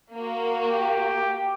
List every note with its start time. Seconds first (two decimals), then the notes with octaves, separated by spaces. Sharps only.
0.14 A#3 F#4
0.71 G4